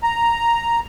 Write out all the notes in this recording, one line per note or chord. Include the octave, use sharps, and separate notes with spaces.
A#5